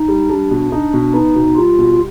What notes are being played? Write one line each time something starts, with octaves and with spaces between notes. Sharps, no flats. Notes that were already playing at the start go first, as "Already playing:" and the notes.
Already playing: D#4
G3
G3 D4
B2
D4 D#4
B2
B3 D#4
B2
G3 F4
B2